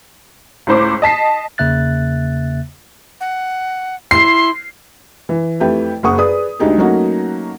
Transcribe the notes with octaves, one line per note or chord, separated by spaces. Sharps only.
C#2 A2 C5 D6
D#5 A5 B6 C7
E2 C#3 A#3 E5 F#6 A6
F#5
E4 C6 C7
E3
F2 A3 E4 G4 B4 G5
F#1 A#3 G#4 F#5 C#6 D#6
G#4 B4 D5 D#6
D2 G#3 D4 D#4 G4 G#4
F#3 A3 A#3 C#4 D#4 F#4